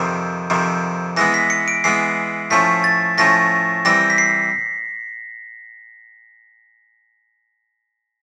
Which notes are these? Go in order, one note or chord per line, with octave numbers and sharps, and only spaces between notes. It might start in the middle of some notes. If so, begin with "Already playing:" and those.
Already playing: F2 C3 D#3
F2 C3 D#3
E3 G#3 B3 A#6
B6
C#7
D7
E3 G#3 B3 C7
A2 F3 A3 C#4 B6
A6
A2 F3 A3 C#4 A#6
E3 G3 C4 A#6
B6
C7